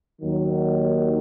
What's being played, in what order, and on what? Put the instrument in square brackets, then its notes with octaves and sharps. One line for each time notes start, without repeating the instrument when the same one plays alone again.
[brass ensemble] D#2 D#3 F#3